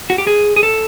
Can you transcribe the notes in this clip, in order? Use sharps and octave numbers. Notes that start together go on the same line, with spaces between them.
F#4
G4
G#4
G#4
A4